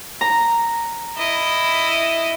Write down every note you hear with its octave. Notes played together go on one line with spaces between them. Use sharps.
A#5
E4 D#5